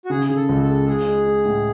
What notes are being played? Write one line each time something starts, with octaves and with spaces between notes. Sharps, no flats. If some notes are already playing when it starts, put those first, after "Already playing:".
F#4
C#3 G#4
C#3 G#4
A4
C#2
A4
G#3
G#3 G#4
G#3
G#3
A2